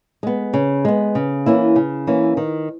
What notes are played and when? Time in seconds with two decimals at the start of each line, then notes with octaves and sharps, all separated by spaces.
0.23 G#3 B3
0.53 C#3
0.85 G#3 B3
1.15 C#3
1.46 E3 A#3 C#4 E4
1.76 C#3
2.07 E3 A#3 C#4 E4
2.37 D#3